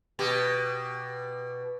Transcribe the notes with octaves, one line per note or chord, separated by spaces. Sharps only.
B2 G4